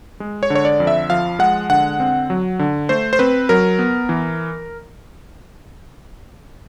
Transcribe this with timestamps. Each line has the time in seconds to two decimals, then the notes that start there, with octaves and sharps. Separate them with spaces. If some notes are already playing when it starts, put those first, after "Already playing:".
0.20 G#3
0.43 C#5
0.50 D3
0.55 C#5
0.65 D5
0.80 F2
0.87 E5
1.10 F3 F5
1.39 G#3 F#5
1.70 D3 F#5
2.00 C4
2.30 F#3
2.59 D3
2.89 A3 C5
3.13 C5
3.19 C4 B4
3.49 F#3 A#4
3.79 B3
4.09 E3